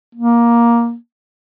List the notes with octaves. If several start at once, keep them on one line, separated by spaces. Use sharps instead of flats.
A#3